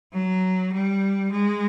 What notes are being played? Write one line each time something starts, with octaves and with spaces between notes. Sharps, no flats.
F#3
G3
G#3